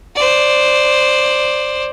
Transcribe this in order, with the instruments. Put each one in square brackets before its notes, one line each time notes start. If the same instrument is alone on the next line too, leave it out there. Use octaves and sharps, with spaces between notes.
[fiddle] C5 D5